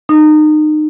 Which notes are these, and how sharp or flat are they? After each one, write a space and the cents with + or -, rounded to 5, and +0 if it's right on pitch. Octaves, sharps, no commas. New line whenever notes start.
D#4 -30